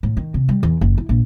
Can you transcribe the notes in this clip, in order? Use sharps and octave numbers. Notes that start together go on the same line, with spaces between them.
A2
D#3
C3
G3
E2
F#1
E4
A#1